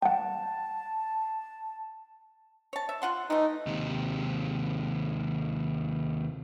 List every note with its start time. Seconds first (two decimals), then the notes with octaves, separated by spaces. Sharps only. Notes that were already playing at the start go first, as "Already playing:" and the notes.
0.02 F#5 G5 A5
2.73 C#5 A5
2.89 E5
3.02 F4 F#5 C6
3.30 E3 A3 D#4
3.67 D#2 C3